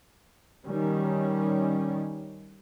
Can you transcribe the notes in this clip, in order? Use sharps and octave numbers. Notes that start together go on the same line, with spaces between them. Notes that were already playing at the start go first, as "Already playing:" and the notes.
D#3 G3 C#4